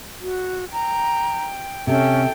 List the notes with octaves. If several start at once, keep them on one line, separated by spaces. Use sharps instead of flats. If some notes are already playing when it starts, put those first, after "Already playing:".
F#4
G5 A#5
C3 C#4 A4 G5